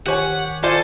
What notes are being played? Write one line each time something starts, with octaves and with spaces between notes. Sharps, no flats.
D#3 G4 C#5 F#5 G#5
F4 A4 C5 D5 G#5